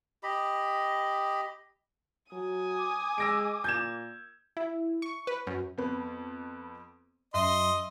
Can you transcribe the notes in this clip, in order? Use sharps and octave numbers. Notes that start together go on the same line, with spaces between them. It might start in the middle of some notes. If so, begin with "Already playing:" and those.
G4 D#5 B5
F#3 G#5 D#6
D6
G#3 E6 A#6 D7
A#2 G6 G#6 E7
E4
C#6
B4
F#2
F2 B3
F#2 D#5 E5 C6